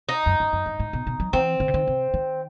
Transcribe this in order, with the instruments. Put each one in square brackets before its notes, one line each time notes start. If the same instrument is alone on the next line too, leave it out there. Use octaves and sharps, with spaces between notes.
[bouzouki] D#4
[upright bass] F#2
F#2
F#2
G2
A2
B2
B2
F#3
[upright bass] E3 [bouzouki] C4
[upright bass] D#3
C3
D#3
C3
D#3